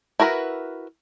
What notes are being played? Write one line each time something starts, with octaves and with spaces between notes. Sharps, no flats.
E4 F#4 A#4 B4